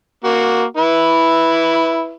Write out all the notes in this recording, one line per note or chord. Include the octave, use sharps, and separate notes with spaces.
A#3 F#4
E4 B4